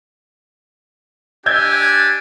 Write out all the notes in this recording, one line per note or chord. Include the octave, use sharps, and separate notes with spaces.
D4 G4 G#5 E6 G6 G#6